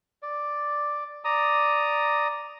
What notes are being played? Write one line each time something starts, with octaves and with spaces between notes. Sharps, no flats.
D5
D5 A#5 D#6